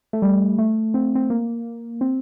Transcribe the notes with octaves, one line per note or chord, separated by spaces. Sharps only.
A3
G3
A3
C4
C4
A#3
C4